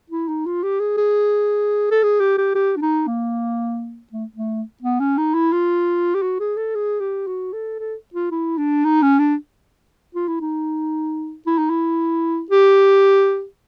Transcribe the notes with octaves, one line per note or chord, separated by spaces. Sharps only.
E4
D#4
F4
G4
G#4
G#4
A4
G#4
G4
G4
G4
D4
D#4
A#3
A3
A3
B3
C#4
D#4
E4
F4
G4
F#4
G#4
A4
G#4
G4
F#4
A4
A4
F4
E4
D4
D#4
C#4
D4
F4
E4
D#4
E4
D#4
E4
G4